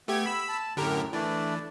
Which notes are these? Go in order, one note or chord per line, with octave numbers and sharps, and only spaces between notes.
A3 B3 G4 G#6
B5 E6
A5
F#2 A2 D3 G4 A#4
E3 A3 D4 D5